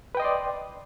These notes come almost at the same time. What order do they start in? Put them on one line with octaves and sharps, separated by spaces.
B4 G5 D#5 C6 D5